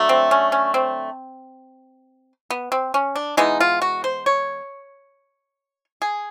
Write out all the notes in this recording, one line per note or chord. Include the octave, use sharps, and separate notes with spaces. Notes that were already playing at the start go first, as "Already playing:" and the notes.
Already playing: D3 F#3 A3
C4
C#4
C#4
C4
B3
C4
C#4
D4
E3 G#3 B3 D#4
F4
F#4
C5
C#5
G#4